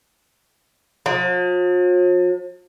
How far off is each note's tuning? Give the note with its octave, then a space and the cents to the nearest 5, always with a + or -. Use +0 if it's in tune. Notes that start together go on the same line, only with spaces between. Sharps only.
F3 +45